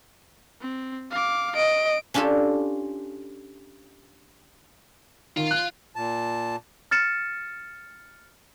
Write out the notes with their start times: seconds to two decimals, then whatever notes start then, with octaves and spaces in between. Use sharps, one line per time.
0.61 C4
1.11 F5 D6
1.56 D#5 D7
2.14 C#4 D4 F4 G4 A4
5.37 D#3 F4
5.51 F#6
5.96 A#2 A5
6.91 F6 A6 C#7 E7